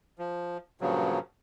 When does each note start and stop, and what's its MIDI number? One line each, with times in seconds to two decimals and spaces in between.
0.19 0.57 53
0.81 1.19 43
0.81 1.19 46
0.81 1.19 49
0.81 1.19 53
0.81 1.19 54